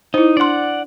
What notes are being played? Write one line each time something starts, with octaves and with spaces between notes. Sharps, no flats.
D#4 E4 C5
D4 D5 F#5 C6